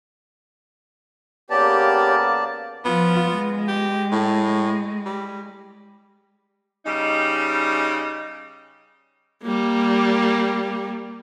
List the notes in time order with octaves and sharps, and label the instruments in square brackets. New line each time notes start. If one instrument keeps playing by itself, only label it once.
[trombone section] C#3 A#3 B3 [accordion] G4 [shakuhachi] C#5 [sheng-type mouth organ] D5 A5
[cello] F3 F4 [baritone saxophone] B3
[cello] G#3
[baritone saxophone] G4
A2
G3
[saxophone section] C#3 G3 D#4
[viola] G3 A#3